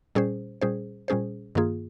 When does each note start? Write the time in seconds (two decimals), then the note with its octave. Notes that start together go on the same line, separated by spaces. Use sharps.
0.15 A#2 G3 C#4 G#4 C5
0.62 A#2 G3 C#4 G#4 C5
1.08 A#2 G3 C#4 G#4 C5
1.55 G2 D#3 A#3 F4 G#4